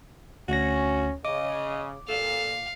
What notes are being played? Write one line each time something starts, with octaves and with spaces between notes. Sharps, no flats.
D2 C#4 F#4 A#6
C#3 D#5 D6
A#2 A4 F5